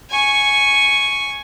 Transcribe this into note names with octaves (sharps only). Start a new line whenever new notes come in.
G#5 C#6